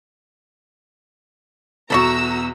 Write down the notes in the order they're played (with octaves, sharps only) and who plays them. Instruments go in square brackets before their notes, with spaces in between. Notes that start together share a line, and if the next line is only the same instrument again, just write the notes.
[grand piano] E2 B2 [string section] F#4 A#5 E6 [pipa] A4 B5 C#6